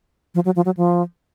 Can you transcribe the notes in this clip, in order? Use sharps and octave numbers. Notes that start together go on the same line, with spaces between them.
F3
F#3
F3
F#3
F3